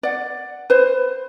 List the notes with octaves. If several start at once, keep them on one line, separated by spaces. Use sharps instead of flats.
D5 F#5
B4 C5